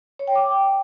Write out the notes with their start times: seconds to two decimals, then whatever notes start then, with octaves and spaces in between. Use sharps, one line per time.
0.19 C#5
0.27 G5
0.35 D6